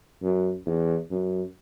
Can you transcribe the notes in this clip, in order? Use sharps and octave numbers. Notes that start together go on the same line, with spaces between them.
F#2
E2
F#2